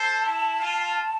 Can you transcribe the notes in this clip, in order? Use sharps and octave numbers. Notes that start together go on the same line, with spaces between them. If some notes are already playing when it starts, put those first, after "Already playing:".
Already playing: A4 C5 A5
E4
F4